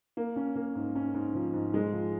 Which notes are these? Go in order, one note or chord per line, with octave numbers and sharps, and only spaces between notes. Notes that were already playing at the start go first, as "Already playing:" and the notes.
A#3
C#4
A#3
G#2
C#4
G#2
F3
G#2
G#3
F3